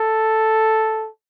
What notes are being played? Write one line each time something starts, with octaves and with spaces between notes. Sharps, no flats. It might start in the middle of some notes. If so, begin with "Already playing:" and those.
Already playing: A4